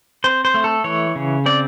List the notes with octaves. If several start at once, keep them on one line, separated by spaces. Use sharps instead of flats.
C4 C5
C5
A3
A4
E3 C#5
C#3
C4 D5